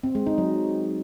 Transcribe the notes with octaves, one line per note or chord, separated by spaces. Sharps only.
C4
G#3
D#4
F#3